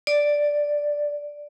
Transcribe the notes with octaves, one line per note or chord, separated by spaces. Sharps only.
D5